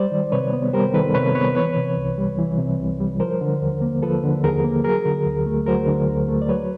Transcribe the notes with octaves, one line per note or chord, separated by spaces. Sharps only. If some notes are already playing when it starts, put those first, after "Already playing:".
Already playing: G3 C5 D5
D#3
C3 B4 C#5
B3
G3 A#4 C5
D#3 A4 B4
C3 B4 C#5
B3 B4 C#5
E3 B4 C#5
C3
C2
G3
E3
C3
C2
G3
F3 A#4 C5
D3
D#2
A#3
F3 A4 B4
D3
D#2 G#4 A#4
A#3
F#3 G#4 A#4
D3
D2
A3
F#3 A#4 C5
D3
D2
A3
D5
F#3 B4 C#5